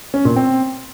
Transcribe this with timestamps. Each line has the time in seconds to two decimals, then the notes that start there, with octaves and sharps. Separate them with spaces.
0.14 C#4
0.25 A#2
0.36 C4